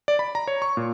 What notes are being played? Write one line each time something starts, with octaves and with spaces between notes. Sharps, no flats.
D5
B5
A#5
C#5
C#6
A#2